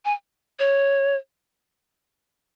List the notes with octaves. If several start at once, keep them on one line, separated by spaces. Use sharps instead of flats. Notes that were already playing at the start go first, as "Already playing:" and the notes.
G#5
C#5